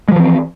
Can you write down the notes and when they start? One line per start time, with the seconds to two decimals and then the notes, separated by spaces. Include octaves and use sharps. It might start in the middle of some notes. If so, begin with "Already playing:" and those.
0.08 G#3
0.12 F3
0.16 E3
0.20 C4